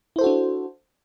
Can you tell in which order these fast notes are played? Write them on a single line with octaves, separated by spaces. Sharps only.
E4 C5 A4 F#4 D4